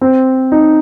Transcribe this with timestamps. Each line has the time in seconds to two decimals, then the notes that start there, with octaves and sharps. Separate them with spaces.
0.01 C4
0.52 D#4